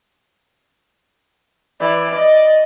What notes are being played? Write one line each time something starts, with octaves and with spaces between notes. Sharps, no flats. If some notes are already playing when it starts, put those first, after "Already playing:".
E3 D5
D#5